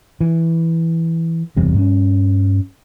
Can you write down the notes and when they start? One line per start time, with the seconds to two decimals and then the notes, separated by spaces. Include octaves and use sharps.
0.21 E3
1.57 F#1 E2 C3 G3
1.74 G2 C4 C#4